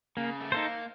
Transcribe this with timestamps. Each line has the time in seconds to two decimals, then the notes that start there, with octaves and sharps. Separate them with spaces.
0.17 C#3 A#3
0.41 A3
0.52 A#3 D#4 A4 C5